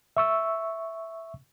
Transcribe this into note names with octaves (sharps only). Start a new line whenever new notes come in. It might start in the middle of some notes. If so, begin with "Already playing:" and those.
E5 C#6 E6